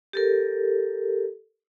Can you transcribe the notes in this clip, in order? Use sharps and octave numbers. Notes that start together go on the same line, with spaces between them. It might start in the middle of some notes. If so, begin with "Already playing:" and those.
G4 A4 A#4